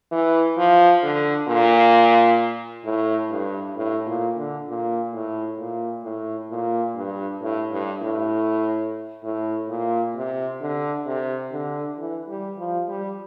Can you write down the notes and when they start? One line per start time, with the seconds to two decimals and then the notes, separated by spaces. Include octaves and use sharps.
0.12 E3
0.58 F3
1.03 D3
1.48 A#2
2.85 A2
3.31 G2
3.76 A2
4.07 A#2
4.37 D3
4.68 A#2
5.13 A2
5.59 A#2
6.05 A2
6.50 A#2
6.96 G2
7.42 A2
7.72 G2
8.02 A2
9.24 A2
9.69 A#2
10.16 C3
10.61 D3
11.06 C3
11.52 D3
11.98 E3
12.28 G3
12.58 F3
12.89 G3